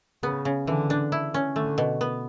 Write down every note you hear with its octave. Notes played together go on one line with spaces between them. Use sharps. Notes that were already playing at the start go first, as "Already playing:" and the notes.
C#3 B3
C#3
D3 E3
D4
E4
C#4
D3 A3
B2
B3